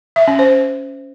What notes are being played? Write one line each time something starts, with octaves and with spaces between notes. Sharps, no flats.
E5
C#4
C5